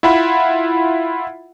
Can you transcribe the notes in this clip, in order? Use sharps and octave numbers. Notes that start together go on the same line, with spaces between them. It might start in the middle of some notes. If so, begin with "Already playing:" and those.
E4 F4 E5 F#5 B5